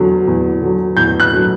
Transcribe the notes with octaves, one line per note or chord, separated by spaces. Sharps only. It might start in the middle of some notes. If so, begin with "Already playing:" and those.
Already playing: E2 D3 F#3
E2
D3 F#3
E2 G6
F#6
D3 F#3